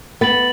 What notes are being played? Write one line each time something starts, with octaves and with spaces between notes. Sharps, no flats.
B3 A6 D7 F#7